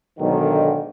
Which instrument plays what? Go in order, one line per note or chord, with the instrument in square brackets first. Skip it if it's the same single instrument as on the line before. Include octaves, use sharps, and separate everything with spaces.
[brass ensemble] B1 G#2 D3 D#3